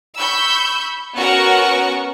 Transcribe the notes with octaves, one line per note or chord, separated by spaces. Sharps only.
B5 C#6 E6 G6
B3 C#4 F#4 A#4 F#5 C#6